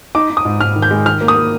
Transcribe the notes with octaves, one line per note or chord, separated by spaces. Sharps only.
D#4 D6
D#4
D#6
G#2
G#2 F6
D#3
G6
G#3
D#3 F6
A#3
D#6
A#3